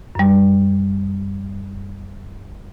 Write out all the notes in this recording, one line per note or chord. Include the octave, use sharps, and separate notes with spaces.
F#2 G3